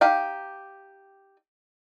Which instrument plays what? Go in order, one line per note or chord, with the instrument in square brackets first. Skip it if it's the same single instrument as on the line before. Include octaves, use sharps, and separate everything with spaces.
[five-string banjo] D#4 G4 F5 G5